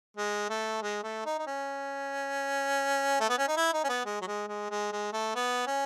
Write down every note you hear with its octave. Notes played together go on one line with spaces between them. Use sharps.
G#3
A3
G#3
A3
D#4
D#4
C#4
A3
B3
C#4
D#4
E4
D#4
C#4
B3
G#3
F#3
G#3
G#3
G#3
G#3
A3
B3
C#4